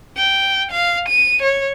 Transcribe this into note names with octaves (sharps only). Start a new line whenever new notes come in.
G5
F5
D#7
C#5